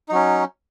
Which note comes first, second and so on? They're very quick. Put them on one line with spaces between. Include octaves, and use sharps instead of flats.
D#4 F#3 C#4